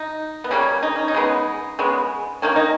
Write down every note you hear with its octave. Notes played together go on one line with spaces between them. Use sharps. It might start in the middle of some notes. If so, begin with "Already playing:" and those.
Already playing: D#4
B3
C#3 G3 A#3 C#4
D#4
C#4
D#4
C#3 G#3 B3
C#3 G#3 B3
D#3 A#3 C#4
D#4